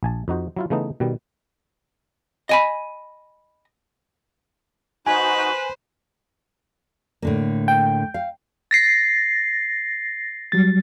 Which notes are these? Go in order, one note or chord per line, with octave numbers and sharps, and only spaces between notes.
A#1 G#5 A5
F2 D#4 F#4 C5
F#3 E4 F4
C#3 E3 A3 B3 D#4
B2 D#3 G3
D#5 G#5 B5
D#4 F#4 B4 C5 G#5
A2 D3 A#3
G5
F5
A6 A#6 C7
F#3 G3 A6